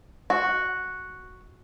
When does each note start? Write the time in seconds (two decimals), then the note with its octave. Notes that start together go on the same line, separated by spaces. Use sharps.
0.30 F#4